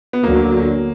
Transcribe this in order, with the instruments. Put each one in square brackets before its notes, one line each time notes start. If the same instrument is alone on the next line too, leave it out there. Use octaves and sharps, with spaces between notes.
[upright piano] B3
[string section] D2 D3 F#3 [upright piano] A#3